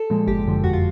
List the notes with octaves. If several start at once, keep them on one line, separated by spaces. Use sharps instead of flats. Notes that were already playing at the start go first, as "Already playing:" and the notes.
Already playing: A4
A#2 F3 G#3
G1 G4
F#2 D3 F3
F2 F#4
F4